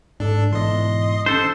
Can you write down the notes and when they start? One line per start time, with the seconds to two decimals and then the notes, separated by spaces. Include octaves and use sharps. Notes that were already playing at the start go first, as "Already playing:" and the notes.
0.20 G#2 D4 A4
0.53 G#2 B2 E3 D#5 C6
1.26 C#4 D4 A4 C5 A5